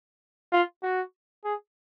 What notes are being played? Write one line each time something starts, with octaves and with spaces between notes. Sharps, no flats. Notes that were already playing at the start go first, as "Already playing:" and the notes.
F4
F#4
G#4